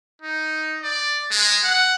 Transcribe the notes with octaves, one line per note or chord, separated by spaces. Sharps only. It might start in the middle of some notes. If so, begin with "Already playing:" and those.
D#4
D5
G#3
F#5